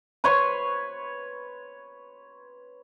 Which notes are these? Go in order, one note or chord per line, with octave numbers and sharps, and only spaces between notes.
B4 C#5 C6